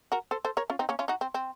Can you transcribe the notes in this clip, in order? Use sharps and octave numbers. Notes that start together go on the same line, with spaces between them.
F#4 A#4
A4 C5
A4 C5
A#4 C#5
C#4 F4
C4 D#4
A#3 C#4
C#4 F4
D#4 F#4
C4
C4